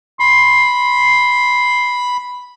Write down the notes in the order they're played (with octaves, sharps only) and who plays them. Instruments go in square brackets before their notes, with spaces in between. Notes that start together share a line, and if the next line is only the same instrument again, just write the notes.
[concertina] B5 [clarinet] C6